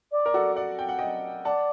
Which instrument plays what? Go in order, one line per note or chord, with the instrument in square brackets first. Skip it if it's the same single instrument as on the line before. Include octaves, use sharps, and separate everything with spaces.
[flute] D5
[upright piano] A#4
F#4 A4
D5 F#5
G5
F#5
D#5 G5
[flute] D5 [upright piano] F#5 A5